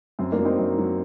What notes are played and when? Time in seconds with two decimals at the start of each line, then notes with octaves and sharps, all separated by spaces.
0.19 F#2 C4
0.32 A#3 D4
0.39 F#3
0.45 C4 D#4
0.59 F#2
0.78 F#3